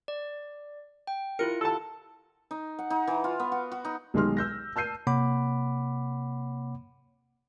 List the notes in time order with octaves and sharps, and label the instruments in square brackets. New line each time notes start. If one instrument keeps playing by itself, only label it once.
[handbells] D5
G5
[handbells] E4 F4 C#7 [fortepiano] A#4
[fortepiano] A4 A5
[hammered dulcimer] D#4
F#5
D#4
E3
F4
B3
F#4
F#4
D#4
[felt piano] B1 D#3 G#3 G4 C6 F6
E6 G6 A#6
A5 E6 G6 C7 D#7
[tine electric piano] C3 A#3 C#5 F#5 B5 D6